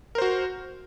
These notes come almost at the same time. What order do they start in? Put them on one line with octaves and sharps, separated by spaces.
A#4 C5 F#4